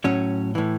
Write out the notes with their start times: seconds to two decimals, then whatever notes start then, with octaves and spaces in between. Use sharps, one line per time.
0.04 A2 F#3 C#4
0.55 A2 E3